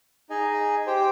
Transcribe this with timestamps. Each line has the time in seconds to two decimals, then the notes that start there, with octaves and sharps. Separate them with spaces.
0.30 D#4 G#4 D#5 G#5
0.87 G4 C5 G5